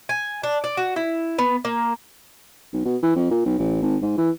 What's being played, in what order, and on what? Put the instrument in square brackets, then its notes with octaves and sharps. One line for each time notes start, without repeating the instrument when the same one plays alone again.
[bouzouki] G#5
D4
D5
F#4
E4
B3
A#3
[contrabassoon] B1
B2
E3
F2
A#2
B1
A1
G#1
G#2
E3